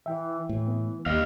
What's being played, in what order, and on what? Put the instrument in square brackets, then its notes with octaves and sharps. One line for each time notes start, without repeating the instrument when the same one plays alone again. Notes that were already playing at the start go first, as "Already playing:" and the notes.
[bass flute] E3 [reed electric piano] E5 G5
[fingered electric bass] A2 [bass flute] E3
[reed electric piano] B3
[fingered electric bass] D#2 [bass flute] G3 [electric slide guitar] D#5 F5